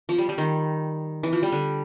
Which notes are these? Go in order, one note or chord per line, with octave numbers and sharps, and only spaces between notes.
F3
G3
G3
D#3
E3
F3
G3
D3